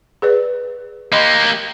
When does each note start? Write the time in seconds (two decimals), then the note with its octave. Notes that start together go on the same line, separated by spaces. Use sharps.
0.22 G#4 B4 D5
1.12 A#3 G4 D#5 B5 C6